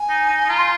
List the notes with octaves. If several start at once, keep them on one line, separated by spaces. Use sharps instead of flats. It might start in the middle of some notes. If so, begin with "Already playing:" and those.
Already playing: G#5
D#4
D#4
D#4
F4 A#5
C6